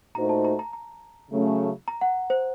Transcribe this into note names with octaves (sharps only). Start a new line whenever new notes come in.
A#2 A3 D#4 F#4 C5 A#5
A5
A#5
A#5
A#5
C#3 F#3 A3 C#4
A#5
F#5
C5